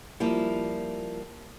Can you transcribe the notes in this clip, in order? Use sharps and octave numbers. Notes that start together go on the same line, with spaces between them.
F3 G3 A#3 E4